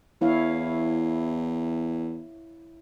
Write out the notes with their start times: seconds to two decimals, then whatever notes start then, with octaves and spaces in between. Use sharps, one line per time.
0.21 E2 E4 C#5 F5